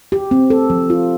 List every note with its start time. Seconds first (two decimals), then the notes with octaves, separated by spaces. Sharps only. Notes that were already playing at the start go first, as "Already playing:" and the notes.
0.12 G4
0.31 C4
0.50 A4
0.70 F3
0.90 F4